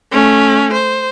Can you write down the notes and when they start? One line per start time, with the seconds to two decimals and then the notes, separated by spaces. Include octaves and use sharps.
0.12 A3 C#4
0.73 C5